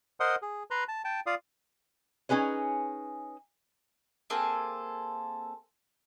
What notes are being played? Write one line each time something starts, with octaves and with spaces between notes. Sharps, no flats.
A#4 C5 D#5 F#5 C6 D#6
G#4
B4 A#5 C6
A5
G5 A5
F4 D5 F5 D#6
C#4 D#4 G#4 B4 C#5
A#3 C4 G#4 A4